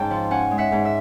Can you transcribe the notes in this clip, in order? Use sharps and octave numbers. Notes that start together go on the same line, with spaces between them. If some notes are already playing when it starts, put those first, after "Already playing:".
Already playing: G#2 C#4 G5 A5
F3
C#4 F#5 G#5
G#3
E5 F#5
G#2
E5